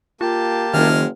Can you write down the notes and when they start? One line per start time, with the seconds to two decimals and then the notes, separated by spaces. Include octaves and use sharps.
0.21 A#3 F4 G4 A5
0.74 F#1 D#3 G#3 F6